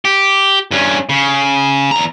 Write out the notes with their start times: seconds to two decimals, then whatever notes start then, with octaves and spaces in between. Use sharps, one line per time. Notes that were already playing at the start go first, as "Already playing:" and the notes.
0.05 G4
0.71 G2 C#4
1.09 C#3
1.91 E2 A#5